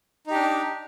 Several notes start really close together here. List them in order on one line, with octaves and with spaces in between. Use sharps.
D#4 G4 D4